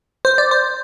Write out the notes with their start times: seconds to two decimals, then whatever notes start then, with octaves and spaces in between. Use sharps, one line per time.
0.25 C5
0.38 D5
0.51 C5